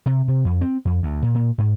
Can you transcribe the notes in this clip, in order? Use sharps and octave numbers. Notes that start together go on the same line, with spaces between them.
C3
C3
F2
C4
F2
D2
A#2
A#2
G#2